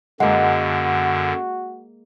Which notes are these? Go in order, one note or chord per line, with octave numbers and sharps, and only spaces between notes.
F#2 D3 G#3 A#3 F#4 F#5